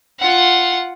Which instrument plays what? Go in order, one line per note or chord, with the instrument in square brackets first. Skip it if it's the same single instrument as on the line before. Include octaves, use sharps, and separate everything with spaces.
[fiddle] F4 F#5